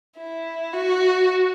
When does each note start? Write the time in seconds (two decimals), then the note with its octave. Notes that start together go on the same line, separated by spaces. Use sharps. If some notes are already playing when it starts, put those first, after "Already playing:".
0.18 E4
0.73 F#4